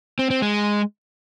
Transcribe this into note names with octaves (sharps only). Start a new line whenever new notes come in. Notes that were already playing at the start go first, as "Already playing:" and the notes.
C4
C4
G#3